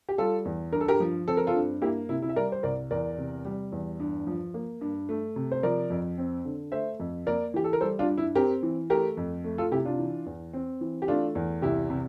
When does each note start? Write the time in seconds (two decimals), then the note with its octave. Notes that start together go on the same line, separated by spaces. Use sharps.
0.09 G4
0.18 G3 F4 A4
0.45 E2
0.72 G2 A#4
0.81 A4
0.88 G4 A#4
1.00 F3
1.28 C4 A4
1.37 A#4
1.47 F4 A4
1.54 G2
1.82 A#3 E4 G4
2.09 C3 E4
2.22 E4
2.29 E5
2.36 G3 A#4 D5
2.52 C5
2.63 C2 A#4 D5
2.91 E2 A#4 D5
3.18 C3
3.45 G3
3.72 E2
4.00 G2
4.27 F3
4.54 A#3
4.81 G2
5.09 A3
5.36 C3
5.52 C5
5.63 F3 A#4 D5
5.90 F2
6.18 C4
6.45 D3
6.72 A3 C5 E5
7.00 F2
7.27 A#3 A#4 D5
7.54 E3 G4
7.64 A4
7.73 A#4
7.81 G3 A4 C5
7.99 D4 F4
8.09 G2
8.18 E4
8.35 C4 G4 A#4
8.63 E3
8.90 A3 G4 A#4
9.17 F2
9.44 A3
9.58 F4 A4
9.71 C3 E4 G4
9.85 D4 F4
9.99 E3
10.26 E2
10.53 C4
10.81 E3
11.02 G4
11.08 A3 D4 F4
11.35 E2
11.62 C2 E4 G4
11.90 C3